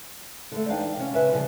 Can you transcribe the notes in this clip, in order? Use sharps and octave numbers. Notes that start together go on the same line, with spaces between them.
D3 A3
E2 D4 D#4 F5 G5
C3 C#4
C#3 B4 E5 G#5
C#3 F3 G3